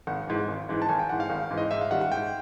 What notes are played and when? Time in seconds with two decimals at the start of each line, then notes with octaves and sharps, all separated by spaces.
0.07 G#1 F#5
0.27 G#2 E3
0.49 G#1
0.69 G#2 E3
0.82 A5
0.89 G#1 G#5
0.99 G5
1.09 G#2 E3 F#5
1.20 F5
1.30 G#1
1.51 G#2 E3
1.58 D#5
1.71 G#2 E5
1.81 F5
1.91 D#3 G3 F#5
2.01 F#5
2.12 G#2 G5